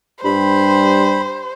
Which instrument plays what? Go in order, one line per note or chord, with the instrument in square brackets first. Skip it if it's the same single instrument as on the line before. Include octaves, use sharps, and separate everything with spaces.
[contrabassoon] G2 [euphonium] G3 [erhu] C5 [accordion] B5